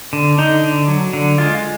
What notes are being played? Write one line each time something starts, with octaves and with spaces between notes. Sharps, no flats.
D3
D3 D#4
D3
F#3
D3
G#3 F4